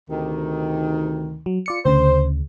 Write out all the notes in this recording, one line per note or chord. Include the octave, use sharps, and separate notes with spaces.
D2 C3 D#3
F#3
F4 D5 C#7
D2 C#3 C5